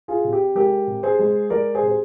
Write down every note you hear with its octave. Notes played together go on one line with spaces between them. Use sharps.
F4 G#4
C3
G4
G#3 G4 A#4
C3
G#4 C5
G#3
G#3 A#4 D5
G#4 C5
C3
C5